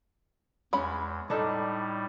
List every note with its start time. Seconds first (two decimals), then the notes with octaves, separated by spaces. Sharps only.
0.73 E2 G#3 C#4 B5
1.30 A2 G3 D4 D#4 A4